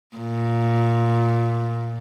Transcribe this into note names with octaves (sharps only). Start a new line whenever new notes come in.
A#2